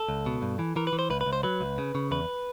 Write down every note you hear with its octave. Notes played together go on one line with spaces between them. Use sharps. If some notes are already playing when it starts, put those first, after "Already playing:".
Already playing: A4
C#2
B2
G2
E3
E3 A#4
B4
E3
C5
C#2 B4
B4
C#2
C5
F#3 B4
C#2
C#3
C#3
E2 B4